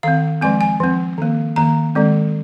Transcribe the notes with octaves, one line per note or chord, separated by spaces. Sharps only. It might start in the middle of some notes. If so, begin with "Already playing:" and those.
D#3 C4 F5
F3 G#3 C4 G#5
G#5
F3 C4
D#3 A#3
D#3 A#3 A#5
D#3 G#3 C4